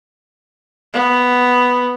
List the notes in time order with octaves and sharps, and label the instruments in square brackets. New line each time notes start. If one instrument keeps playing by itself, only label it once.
[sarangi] B3